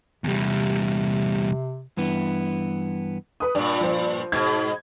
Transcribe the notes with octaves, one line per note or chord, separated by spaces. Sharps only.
E2 C3 G3
G2 E3 B3
B4 D#6
G2 A#2 D5
F3 C5
G#2 B2 G#6